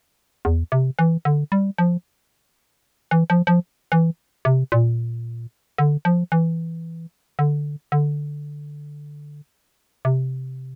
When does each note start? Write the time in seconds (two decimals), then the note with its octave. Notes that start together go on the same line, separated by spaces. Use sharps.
0.45 E2
0.72 C3
0.99 E3
1.25 D3
1.52 G3
1.78 F3
3.11 E3
3.30 F3
3.47 F3
3.92 E3
4.45 C3
4.72 A#2
5.78 D3
6.05 F3
6.32 E3
7.39 D3
7.92 D3
10.05 C3